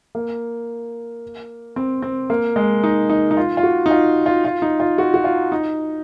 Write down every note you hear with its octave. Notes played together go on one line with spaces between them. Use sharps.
A#3
C4
C4
A#3
G#3
D#4
D#4
D#4
F4
F4
F#4
D#4
F4
F4
F4
D#4
F4
F#4
F#4
F4
D#4